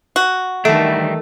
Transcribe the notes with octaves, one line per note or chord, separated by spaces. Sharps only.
F#4
D#3 E3 G3 A3 D4